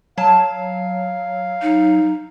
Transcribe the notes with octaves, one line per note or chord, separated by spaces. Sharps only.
F#3 F5 A5
D#4